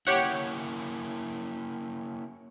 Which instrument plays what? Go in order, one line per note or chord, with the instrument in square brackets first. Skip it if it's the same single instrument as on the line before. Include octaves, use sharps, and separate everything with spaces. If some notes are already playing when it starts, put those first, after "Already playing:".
[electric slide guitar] A#3 C#4 E4 [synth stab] G4 C#5 F#5